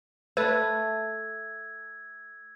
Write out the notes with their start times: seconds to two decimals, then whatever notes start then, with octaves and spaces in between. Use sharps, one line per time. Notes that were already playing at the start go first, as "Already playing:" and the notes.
0.37 A3 B4 E6 G#6 A6